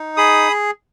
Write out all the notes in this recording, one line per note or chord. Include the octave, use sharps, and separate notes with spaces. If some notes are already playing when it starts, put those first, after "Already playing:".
Already playing: D#4
G#4 B5 D#6